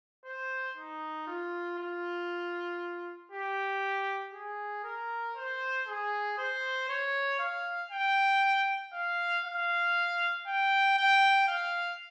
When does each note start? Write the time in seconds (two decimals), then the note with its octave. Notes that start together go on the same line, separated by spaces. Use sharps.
0.25 C5
0.77 D#4
1.27 F4
1.78 F4
3.32 G4
4.33 G#4
4.84 A#4
5.36 C5
5.87 G#4
6.38 C5
6.89 C#5
7.40 F5
7.91 G5
8.93 F5
9.45 F5
10.47 G5
10.98 G5
11.48 F5